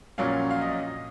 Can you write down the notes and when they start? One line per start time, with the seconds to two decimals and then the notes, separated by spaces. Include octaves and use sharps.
0.18 A#1 A#2 F#3 C#4 F5
0.51 F5
0.61 D#5